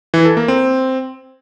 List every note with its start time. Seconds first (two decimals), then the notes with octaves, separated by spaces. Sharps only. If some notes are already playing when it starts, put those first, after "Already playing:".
0.14 E3
0.25 A4
0.37 A#3
0.48 C4